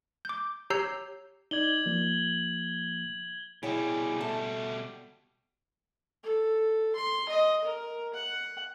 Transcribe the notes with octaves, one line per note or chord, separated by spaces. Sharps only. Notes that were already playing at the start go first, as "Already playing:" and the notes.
D6 G6
G4 C#5 A#5 E6 G6 C7
D#4 D5 G#6 F#7 G7
F3 A#3
B2 G3 E4 G#4 C#5 G5
A3 A5
A4
C6
D#5
A#4
F#5